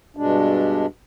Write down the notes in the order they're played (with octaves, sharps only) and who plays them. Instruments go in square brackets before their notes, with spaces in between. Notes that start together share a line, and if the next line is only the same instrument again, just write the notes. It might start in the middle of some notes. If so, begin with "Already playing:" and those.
[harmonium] G2 B2 G#3 D4